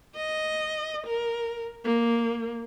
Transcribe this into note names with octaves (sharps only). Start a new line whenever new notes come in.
D#5
A#4
A#3